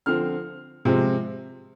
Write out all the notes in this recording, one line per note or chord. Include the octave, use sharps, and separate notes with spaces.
D3 F3 C4 F6
C3 F3 G#3 C4